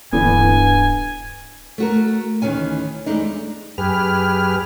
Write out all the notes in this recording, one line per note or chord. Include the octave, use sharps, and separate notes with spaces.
D1 G2 D3 E3 B3 G#5
A3 F#4 A#4
D2 D#3 E3 C#4 G#5
E2 A#2 G#3 A3 D4 D#4
F#2 G4 G#4 B4 F6